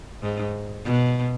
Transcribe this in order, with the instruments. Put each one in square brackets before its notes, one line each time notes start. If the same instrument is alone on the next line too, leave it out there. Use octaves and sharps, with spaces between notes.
[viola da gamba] G#2
B2